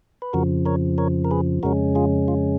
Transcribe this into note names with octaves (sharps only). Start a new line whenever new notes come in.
B4
F2 C#3 F3 F#4 A#4
A#4 C#5
A#4 C#5
A#4
G#4 B4
F2 C#3 G#3 C#4 F#4 A#4
F4 G#4
F4